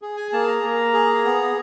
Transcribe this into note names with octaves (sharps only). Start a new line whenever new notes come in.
G#4
G#5
A#3 A5
A#5
A#3
G#4
B3